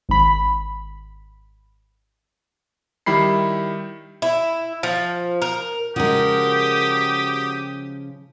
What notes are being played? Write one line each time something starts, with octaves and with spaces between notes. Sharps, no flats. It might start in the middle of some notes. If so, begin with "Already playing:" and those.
G#1 B5
D#3 G3 E4 B5 C7
E4
F3
A#4
C#3 F3 G#3 F#4 G4 A#4 D#6